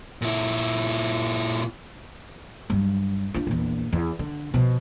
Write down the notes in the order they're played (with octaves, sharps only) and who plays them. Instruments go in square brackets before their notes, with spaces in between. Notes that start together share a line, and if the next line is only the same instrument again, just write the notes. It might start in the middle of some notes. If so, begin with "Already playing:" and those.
[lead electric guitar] A#2 E4
[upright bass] G2 F#3
D4 F4
A#1 E2
E2
D3
B2 F3